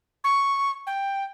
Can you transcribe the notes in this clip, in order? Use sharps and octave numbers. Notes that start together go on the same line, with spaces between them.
C#6
G5